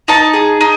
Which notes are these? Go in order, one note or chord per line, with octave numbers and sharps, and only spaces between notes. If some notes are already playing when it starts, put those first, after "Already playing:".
D#4 A5
G#4
D#4